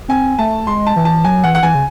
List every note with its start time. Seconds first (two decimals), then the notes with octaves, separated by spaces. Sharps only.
0.08 C4 G#5
0.38 A3 A5
0.67 G#3 C6
0.87 A5
0.96 E3
1.05 A5
1.24 F#3 G#5
1.44 E3 F#5
1.55 F#5
1.63 E3 G#5
1.75 C#3